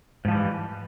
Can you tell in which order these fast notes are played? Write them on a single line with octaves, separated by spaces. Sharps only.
G#2 F3 G3 E3